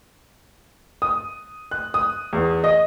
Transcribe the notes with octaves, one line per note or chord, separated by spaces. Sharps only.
D#6
F#6
D#6
E2
D#5